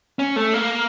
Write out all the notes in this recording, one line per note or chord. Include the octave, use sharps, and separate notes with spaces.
C#4
A3
A#3